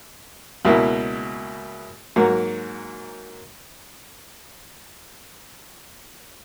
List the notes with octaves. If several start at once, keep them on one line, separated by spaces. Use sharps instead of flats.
C#2 B2 A#3 E4
G#2 F#3 A#3